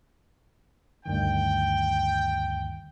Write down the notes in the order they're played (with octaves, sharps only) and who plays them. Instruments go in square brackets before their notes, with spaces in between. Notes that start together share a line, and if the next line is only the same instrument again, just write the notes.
[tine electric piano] D2 G2 D#3 [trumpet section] G5